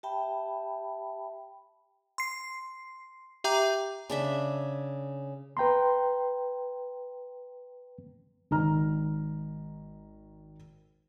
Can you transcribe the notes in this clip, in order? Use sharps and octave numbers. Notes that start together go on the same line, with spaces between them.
G4 E5 G5 A5 B5
C6 C7
G4 E5 G5 A#5 D6 G6
C#3 D4 E5
B4 G5 A#5 C6
G#1 D#3 A#5 F6